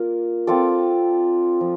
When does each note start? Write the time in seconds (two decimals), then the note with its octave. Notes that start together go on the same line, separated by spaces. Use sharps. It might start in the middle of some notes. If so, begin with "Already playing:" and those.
Already playing: A#3 F4 A#4 D5
0.47 C4 F4 A4 D5
1.61 F3